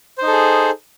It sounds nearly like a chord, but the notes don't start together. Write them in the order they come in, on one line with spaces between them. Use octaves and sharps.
C5 D#4 A4 G#4